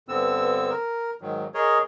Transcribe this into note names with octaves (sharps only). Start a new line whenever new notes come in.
G2 D3 B3 C4 E6
A#4
G#2 D#3 F#3
G#4 A#4 C#5 D#5